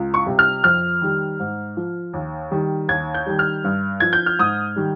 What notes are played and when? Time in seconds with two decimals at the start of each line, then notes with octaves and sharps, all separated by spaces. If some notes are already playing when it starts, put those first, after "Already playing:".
Already playing: C#2
0.14 C#6
0.26 C3 G3
0.39 F6
0.64 F2 F6
1.01 D#3 G3
1.39 G#2
1.77 F3
2.13 D#2
2.51 D#3 G3
2.88 D#2 G#6
3.14 G6
3.26 D#3 G3
3.39 F6
3.64 G2
4.00 F3 G#6
4.13 G6
4.26 F6
4.39 G#2 D#6
4.76 D#3 G3